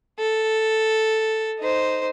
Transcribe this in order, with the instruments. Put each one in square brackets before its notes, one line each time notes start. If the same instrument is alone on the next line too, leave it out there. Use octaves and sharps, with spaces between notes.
[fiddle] A4
D#4 C5